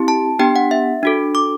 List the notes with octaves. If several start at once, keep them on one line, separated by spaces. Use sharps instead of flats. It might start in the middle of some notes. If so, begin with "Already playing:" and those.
Already playing: C4 E4 G4
A5
B3 D4 G4 G5
F#5
E5
D4 F#4 A4
D6